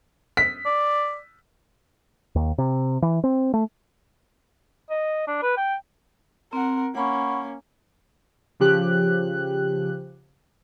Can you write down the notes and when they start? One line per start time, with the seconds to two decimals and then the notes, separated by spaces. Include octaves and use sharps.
0.37 B6
0.66 D5
2.35 D#2
2.58 C3
3.02 E3
3.24 C4
3.54 A3
4.90 D#5
5.27 D4
5.42 B4
5.57 G5
6.53 C4 A#4 F#5
6.95 A#3 C#4 F#5 B5 C#6
8.60 C#3 F3 G4 F#6